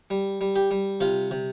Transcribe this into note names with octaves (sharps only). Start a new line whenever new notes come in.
G3
G3
G4
G3
C3 F4
C3